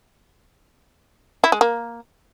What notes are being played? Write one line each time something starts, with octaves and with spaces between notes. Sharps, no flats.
E4
G#3
A#3